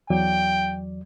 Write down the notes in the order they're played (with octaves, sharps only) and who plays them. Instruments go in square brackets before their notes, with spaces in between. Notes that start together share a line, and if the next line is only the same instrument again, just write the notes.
[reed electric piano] E2 F#3 D5 [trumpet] G5